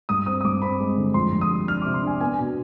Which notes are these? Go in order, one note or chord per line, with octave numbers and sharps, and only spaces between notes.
G2 D#6
C4 D#6
D#6
G2 D6
C4 B5
G#3
D3
F2 C6
F2
D#6
G3
D4 F6
C3 D6
C6
D4 G#5
B3 G#5
B2